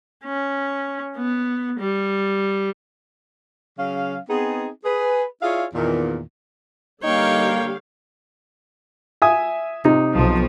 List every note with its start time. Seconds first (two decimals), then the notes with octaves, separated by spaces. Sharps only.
0.25 C#4
1.16 B3
1.79 G3
3.79 C#3 F#3 C#4 F5
4.29 B3 C4 D#4 G#4
4.84 G#4 B4
5.42 E4 F4 G#4 C#5 D5 F5
5.74 E2 A#2 D#3
7.03 D3 G3 A#3 D#4 C#5 F5 G5
9.22 E5 G#5 D#6
9.85 C3 D#4
10.15 B1 F3